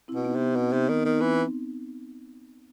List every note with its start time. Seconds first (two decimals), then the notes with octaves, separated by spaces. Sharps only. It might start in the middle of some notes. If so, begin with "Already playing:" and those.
0.08 C4 E4
0.14 B2
0.25 B3 D#4
0.35 C3
0.41 B3
0.56 B2 C4
0.73 C3 B3 D#4
0.83 C4
0.89 D#3 B3
1.05 D#3 B3
1.13 D#4
1.21 E3 C4